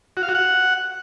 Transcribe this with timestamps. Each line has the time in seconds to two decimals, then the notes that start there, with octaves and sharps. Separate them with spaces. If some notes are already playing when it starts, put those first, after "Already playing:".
0.17 F#4
0.23 F5
0.29 F#4
0.35 F#5